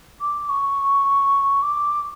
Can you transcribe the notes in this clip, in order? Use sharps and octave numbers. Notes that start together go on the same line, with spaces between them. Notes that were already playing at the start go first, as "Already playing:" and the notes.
D6
C#6
D6